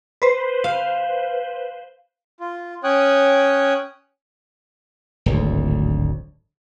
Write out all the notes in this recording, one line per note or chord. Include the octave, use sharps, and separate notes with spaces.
B4 C5
F5
F4
C#4 C#5 G5 D#6 F#6
D1 G#1 D2